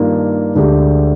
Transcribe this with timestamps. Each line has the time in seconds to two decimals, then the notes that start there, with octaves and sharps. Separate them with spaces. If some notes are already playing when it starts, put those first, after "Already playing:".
Already playing: G2 D#3 A#3 D4 F4
0.55 D2 D3 G#3 D4 G4